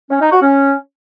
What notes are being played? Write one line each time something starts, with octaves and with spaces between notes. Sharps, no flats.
C#4
D#4
F#4
C#4